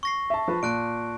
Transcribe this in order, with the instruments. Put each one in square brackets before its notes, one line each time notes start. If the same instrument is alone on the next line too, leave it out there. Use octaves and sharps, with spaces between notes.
[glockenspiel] C#6 A#6 C7
[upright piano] E5 A5
F3 B4 A5
[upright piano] A#2 [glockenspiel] A5 F#6 D7